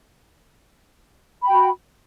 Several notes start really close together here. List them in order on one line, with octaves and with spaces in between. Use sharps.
B5 G5 F#4